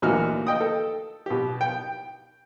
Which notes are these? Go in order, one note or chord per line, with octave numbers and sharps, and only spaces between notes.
D2 A#2 E3 D#4 F#4 F6
D#5 G5 D#6
A4
B2 G4
G5